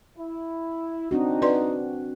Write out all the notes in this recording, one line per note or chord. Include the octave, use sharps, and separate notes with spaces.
E4
C4 D4 D#4 F#4
F#4 B4 D5 C6